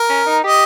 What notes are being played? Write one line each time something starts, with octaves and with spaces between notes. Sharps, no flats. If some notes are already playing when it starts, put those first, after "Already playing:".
Already playing: A#4
C#4
D#4
G4 D#5